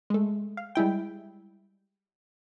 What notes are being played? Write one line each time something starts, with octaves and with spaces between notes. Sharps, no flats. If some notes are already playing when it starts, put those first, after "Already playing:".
G#3 A3
F5
G3 G#3 E4 G5